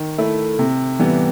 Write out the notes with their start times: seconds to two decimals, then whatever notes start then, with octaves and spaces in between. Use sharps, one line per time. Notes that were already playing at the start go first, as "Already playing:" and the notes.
Already playing: D#3
0.18 A3 E4
0.59 C3
0.99 E3 G3 B3